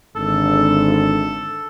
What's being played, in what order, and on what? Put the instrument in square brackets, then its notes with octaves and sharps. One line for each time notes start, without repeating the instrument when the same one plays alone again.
[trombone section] G#1 D3 [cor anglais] A4